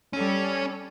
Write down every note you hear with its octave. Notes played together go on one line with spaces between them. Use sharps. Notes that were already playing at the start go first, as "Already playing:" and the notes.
G3 C#4 A4